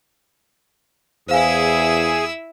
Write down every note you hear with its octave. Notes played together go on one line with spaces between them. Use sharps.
E2 E4 G#4 C5 F5 G#5 E6